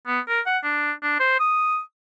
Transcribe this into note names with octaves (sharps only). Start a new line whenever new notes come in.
B3
A#4
F#5
D4
D4
C5
D#6